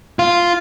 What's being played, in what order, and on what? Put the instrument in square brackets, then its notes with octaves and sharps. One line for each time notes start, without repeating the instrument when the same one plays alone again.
[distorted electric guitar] F4